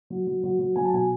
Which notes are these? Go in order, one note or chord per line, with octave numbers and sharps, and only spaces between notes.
F#3
F#3
F#3
F#3
F#3 G#5
A5
B2 G#5